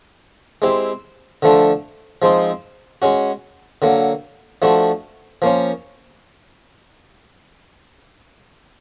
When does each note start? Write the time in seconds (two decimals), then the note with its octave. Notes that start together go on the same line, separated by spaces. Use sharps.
0.62 G#3 C4 E4 G4
1.43 D3 F3 A3 D4
2.22 F3 G#3 C4 D#4
3.02 G#3 C#4 F#4
3.82 D3 F#3 A#3
4.62 F3 A3 D4 F#4
5.42 F3 A#3 C#4